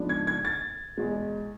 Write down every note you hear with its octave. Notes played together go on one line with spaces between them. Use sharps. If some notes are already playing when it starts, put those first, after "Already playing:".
Already playing: G#2 F3 B3 D4
G#6
G#6
A6
E2 B2 G#3